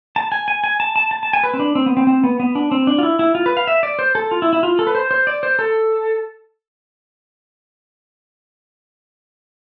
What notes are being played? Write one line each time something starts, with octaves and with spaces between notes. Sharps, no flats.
A5
G#5
G#5
G#5
A5
A5
A5
A5
G#5
B4
C4
D4
C4
B3
C4
C4
B3
B3
D4
C4
D4
F4
E4
E4
F4
B4
F5
E5
D5
C5
A4
F4
E4
E4
F4
A4
B4
C5
C5
D5
C5
A4